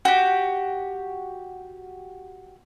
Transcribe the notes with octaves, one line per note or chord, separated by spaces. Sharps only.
F#4 G4